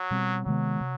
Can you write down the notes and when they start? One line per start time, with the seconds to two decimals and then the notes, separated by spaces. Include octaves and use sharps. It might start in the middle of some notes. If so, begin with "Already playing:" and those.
Already playing: F#3
0.11 B2 G3 C4
0.46 C3 D#3 F#3 G#3 B3
0.81 C3